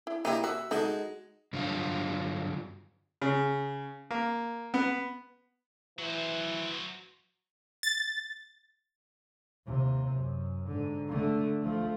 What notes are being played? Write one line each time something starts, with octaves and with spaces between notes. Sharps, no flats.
E4
A#3 D#4 E4 G4
F#4 E5
G#3 D#4 F#4 A4 D#5
G2 D3 F#3 G3 F4
C#3
A#3
B3
E3 F#3 C5
A6
D#2 C3
F#2
G#2 D3
D3 A3
F3 A3